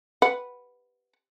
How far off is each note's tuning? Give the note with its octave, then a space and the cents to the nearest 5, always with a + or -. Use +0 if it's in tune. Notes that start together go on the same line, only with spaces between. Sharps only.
B4 +0 F#5 +5